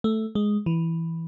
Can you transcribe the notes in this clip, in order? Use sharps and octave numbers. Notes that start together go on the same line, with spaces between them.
A3
G#3
E3